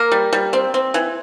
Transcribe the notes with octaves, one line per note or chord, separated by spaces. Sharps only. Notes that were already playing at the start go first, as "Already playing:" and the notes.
Already playing: A#3 A#4
G3
G3
C4
C4
E3